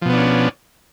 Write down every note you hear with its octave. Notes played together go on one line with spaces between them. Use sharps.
B2 F3 B3 C#4 D4